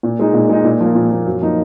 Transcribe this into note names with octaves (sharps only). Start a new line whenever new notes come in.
A#2
G#3 D#4
A#2
G#3 D#4
A#2
F3 A#3
A#2
F3 A#3
F#2
F3 A#3 D#4